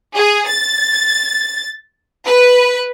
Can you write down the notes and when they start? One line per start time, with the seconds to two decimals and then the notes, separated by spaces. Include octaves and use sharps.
0.16 G#4
0.49 A6
2.27 B4